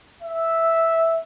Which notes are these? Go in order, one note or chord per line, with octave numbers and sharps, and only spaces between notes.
E5